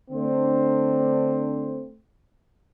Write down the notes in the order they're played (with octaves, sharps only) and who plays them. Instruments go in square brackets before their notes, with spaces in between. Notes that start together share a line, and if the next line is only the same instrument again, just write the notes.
[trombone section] D3 A3 C4 D4 C5